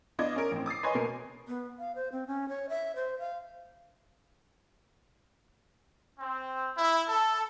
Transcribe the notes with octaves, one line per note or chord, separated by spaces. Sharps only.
B3 D4 F4 D#5 D6 G#6
C#4 A#4 D7
A1 C4
D6 D#6 A6 C7
B4 C#5 D#5 G#5 C6
B2 A#3 A#4 G#5 C7
B3
F5
C5
C4
C#4
C#5
E5
C5
F5
C4
E4
A4